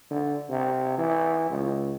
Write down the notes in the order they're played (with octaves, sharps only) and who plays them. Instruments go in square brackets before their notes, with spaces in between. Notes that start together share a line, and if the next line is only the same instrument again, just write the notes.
[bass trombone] D3
C3
E3
C#2